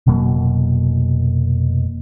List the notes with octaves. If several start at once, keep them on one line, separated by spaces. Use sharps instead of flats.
F1 B2 F#3 A#3